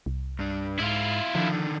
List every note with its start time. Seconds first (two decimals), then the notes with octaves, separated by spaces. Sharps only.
0.06 C2
0.39 G2 D4
0.80 G#2 E4 F4
1.35 D3 D#3 F3 D4